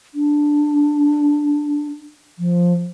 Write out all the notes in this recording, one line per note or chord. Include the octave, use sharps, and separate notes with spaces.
D4
F3